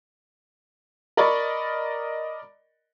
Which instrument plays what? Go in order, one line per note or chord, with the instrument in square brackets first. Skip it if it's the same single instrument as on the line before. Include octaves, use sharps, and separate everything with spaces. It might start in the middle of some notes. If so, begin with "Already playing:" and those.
[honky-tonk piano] A#4 D5 D#5 B5 C#6 A6